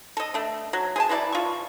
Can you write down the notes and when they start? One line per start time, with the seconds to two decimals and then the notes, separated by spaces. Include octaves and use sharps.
0.17 A4 D#5
0.34 A3 D4
0.73 F#3
0.96 G#4 C5 A5
1.09 E3 F#3 E4 D5
1.32 F4 C#6